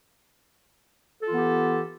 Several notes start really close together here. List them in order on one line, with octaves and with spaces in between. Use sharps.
A4 F4 E3 B3 G4